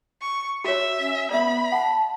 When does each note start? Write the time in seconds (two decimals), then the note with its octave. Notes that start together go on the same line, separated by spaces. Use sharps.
0.21 C#6
0.65 F#4 C#5 E5
0.99 C#4
1.31 B3 D5 E5 B5
1.72 F#5 A5